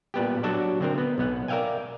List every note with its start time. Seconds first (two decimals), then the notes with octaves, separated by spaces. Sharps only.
0.14 A#2 G3 B3 G4
0.43 F#3 D4 F#4 A4 D5
0.80 D3 C4 A#4
0.98 B3
1.18 B1 B3 F#5
1.48 A#4 D5 E5 F5 G5 G#5